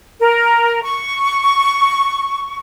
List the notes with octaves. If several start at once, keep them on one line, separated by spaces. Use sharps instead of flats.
A#4
C#6